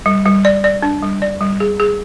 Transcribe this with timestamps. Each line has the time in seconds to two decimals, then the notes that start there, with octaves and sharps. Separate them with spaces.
0.06 G3
0.25 G3
0.45 D5
0.64 D5
0.82 D4
1.02 G3
1.22 D5
1.41 G3
1.60 G#4
1.80 G#4